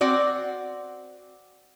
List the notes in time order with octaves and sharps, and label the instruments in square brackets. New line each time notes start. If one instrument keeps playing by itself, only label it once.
[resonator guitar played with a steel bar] C4 F#4 D5